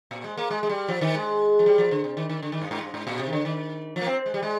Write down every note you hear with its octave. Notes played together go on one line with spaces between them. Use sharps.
A#2
G#3
A#3
G#3
G#3
G3
F3
D#3
G#3
F3
G3
F3
D3
C3
D#3
D#3
D3
D#3
G2
G#2
G2
G#2
A#2
C3
D#3
D3
D#3
F3
A#3
C4
G#3
G3
G#3